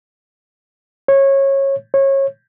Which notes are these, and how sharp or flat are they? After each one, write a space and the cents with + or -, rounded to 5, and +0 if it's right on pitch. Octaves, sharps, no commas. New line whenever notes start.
C#5 -20
C#5 -25